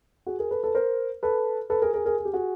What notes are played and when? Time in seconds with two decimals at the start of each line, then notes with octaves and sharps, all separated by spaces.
0.27 F#4 G#4
0.39 G#4 A#4
0.51 A4 B4
0.64 A4 B4
0.75 A#4 C5
1.23 A4 B4
1.70 A4 B4
1.82 G#4 A#4
1.94 G#4 A#4
2.06 G#4 A#4
2.18 G#4
2.25 G4
2.34 F#4 G#4